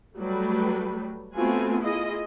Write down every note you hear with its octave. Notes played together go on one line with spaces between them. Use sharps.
F#3 G3 A3 B4
A3 B3 C4 F4 F#4 G#5
E4 F4 G#4 D#5